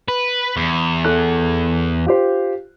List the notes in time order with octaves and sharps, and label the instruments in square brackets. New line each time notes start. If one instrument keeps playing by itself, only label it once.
[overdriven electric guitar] B4
E2
[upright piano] A4 F#6
F4 G4 C5